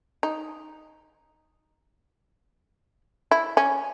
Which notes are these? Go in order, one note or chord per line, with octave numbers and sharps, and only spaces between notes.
D#4
E4
C#4